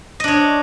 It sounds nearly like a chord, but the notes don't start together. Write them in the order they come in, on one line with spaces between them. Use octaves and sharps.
D#5 D4 C#5